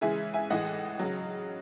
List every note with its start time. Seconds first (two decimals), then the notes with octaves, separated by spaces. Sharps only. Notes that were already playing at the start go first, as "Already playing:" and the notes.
0.01 C#3 E3 G#3 E5 G#5
0.34 E5 G#5
0.50 A2 E3 G#3 D#5 F#5
0.99 C#3 F#3